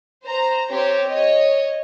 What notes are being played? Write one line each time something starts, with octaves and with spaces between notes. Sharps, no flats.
C5 A#5
C4 G4 C5 C#5
C#5 D#5